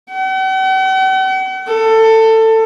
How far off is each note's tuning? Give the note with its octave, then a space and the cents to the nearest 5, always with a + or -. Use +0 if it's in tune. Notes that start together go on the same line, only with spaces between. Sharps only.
F#5 +45
A4 +20